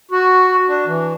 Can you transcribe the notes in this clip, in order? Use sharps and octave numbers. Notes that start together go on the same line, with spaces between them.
F#4
D4
E3